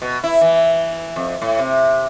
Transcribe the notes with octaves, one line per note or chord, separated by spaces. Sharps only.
B2
E4
E3
F2
A2
C3